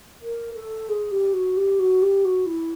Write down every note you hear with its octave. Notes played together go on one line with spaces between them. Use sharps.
A#4
A4
G#4
G4
F#4
G4
F#4
G4
F#4
E4